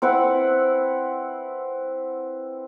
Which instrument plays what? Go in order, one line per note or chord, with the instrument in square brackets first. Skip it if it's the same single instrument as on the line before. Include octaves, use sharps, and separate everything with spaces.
[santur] C4 E4 B4 F#5